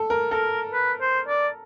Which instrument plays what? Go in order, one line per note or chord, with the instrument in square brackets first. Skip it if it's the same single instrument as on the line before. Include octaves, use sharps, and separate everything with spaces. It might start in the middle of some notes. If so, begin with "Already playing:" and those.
Already playing: [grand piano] A4
A#4
[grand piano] A4 [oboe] A#4
[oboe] B4
C5
D5